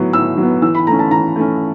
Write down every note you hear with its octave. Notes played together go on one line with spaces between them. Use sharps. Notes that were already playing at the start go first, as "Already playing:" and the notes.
Already playing: A2 F#3 B3
A2 E6
F#3
B3
E3 E6
B5
A3 C#4 A#5
A5
E3 A#5
A3 C#4